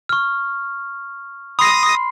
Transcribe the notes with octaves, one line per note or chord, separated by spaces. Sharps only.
C#6 F6
B5 C6 D#6 A#6 C7